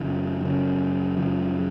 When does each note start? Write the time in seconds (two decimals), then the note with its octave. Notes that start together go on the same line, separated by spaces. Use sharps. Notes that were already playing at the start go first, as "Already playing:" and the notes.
Already playing: F#2 C#3 F3
0.41 F#2 C#3
1.17 F#2 C#3 F3